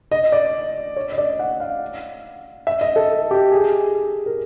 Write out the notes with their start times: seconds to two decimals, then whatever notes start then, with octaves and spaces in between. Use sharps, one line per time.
0.11 D#5
0.32 D5
0.96 C#5
1.12 D#5
1.18 D5
1.39 F#5
1.60 F5
2.67 E5
2.81 D#5
2.96 A4
3.31 G4
3.52 G#4
4.26 A#4